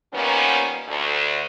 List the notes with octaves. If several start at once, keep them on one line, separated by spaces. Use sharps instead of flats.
D#3 F3 G3 A#3 B3 C#4
D2